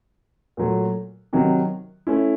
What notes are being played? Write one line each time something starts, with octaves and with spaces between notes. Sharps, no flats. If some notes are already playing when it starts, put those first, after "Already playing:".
A#2 F#3 A3
C3 D#3 F#3
A3 C#4 E4